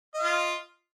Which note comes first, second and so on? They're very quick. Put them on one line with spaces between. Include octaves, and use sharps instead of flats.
D#5 F5 F4